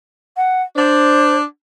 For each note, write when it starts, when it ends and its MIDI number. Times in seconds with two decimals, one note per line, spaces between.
0.37 0.62 78
0.76 1.43 62
0.76 1.36 72